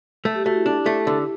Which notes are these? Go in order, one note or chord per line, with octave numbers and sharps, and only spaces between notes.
A3 A4
G4
A3 F#4
E4 G4
D4
A3
D3